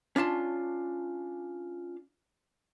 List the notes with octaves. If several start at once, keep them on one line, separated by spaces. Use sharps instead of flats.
C#4 D4 F4 A5